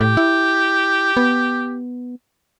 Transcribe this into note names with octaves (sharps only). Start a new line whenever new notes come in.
A2 G4
E4
B3